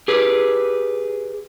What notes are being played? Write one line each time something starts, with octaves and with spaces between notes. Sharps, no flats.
G4 G#4 B4